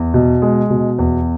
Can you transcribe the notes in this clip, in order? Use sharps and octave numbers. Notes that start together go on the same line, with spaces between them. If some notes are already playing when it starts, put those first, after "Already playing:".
Already playing: E2
B2
G#3
B2
E2